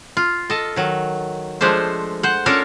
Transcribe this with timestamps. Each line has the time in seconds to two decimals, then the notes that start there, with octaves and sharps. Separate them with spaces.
0.17 F4
0.50 A4 D#5
0.76 D#3 F#3
1.61 F3 G#3 A3 D4 C5
2.23 C5 F#5
2.46 C#4 D4 F4 A4 A#4 C#5